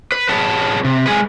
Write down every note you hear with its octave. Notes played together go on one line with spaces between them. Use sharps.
B4
C#4 G#4 B4 A5
C3
G#3 G#4 B4